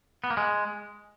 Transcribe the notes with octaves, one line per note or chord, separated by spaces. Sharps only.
B3
A#3
G#3